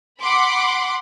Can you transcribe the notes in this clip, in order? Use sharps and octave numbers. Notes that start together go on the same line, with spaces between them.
F#5 B5 C6 D6